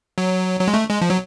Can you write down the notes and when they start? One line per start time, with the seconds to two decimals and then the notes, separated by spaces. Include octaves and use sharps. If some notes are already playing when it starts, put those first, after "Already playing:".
0.18 F#3
0.60 F#3
0.68 G#3
0.74 A3
0.89 G#3
1.02 F3
1.10 F#3